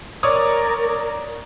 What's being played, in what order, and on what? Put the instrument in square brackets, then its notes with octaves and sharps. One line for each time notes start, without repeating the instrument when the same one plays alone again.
[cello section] A#4 [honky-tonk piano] C#5 D5 D#6